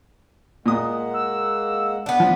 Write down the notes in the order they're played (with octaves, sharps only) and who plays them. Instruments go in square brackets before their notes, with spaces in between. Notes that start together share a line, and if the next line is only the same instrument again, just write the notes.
[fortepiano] A#2 D#6 [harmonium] G#3 A#3 F#5
[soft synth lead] E6
[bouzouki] B3 D4
[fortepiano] F3